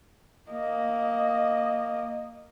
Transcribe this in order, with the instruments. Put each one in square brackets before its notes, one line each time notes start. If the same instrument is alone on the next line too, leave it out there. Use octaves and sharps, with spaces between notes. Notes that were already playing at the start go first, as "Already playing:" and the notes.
[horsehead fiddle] A#3 D#5